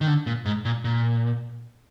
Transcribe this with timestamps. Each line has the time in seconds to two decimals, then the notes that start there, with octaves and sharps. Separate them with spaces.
0.01 D#3
0.07 D3
0.26 A#2
0.45 G#2
0.65 A#2
0.84 A#2